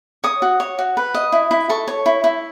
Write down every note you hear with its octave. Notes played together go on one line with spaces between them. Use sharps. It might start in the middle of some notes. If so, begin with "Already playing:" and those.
C#5 D#6
F#4
C#5
F#4
B4
D#5
E4
E4
A4 C#6
C#5
E4
E4